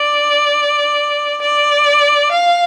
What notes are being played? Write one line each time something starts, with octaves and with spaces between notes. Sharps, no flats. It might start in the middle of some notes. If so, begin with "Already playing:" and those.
Already playing: D5
D5
F5